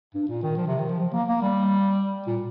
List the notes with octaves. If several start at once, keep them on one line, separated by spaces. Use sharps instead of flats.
G2
A#2
D#3
F3
C3
D#3
F3
F3
A#3
A#3
G3
A#2